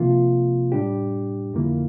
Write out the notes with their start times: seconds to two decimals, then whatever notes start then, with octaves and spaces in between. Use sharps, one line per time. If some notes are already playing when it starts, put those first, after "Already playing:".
Already playing: C3 F3 A#3 F4
0.72 A2 G3 D4 G4
1.53 F2 D3 F3 A#3 E4